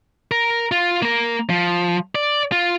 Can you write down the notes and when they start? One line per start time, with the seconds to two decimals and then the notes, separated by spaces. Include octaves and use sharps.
0.31 A#4
0.72 F4
1.02 A#3 A#4
1.50 F3
2.15 D5
2.52 F4